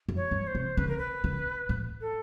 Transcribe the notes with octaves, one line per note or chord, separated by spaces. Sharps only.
F#2
C#5
G2
C5
C3
C#3 B4
A#4
B4
C#3
A2
A4